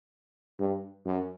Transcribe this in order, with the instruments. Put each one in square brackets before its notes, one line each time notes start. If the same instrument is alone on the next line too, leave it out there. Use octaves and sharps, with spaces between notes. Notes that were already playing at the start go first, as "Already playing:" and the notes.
[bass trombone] G2
F#2